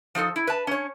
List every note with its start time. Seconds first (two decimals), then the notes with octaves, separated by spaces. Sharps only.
0.15 F3 D#4 F#4 A4
0.36 E4
0.47 B4 A5
0.67 C#4 C#5